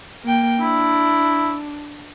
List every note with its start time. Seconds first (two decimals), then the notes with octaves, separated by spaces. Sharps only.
0.24 A#3 G5
0.61 D4 E4